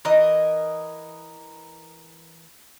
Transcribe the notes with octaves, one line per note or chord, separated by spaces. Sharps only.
E3 A#4 D#5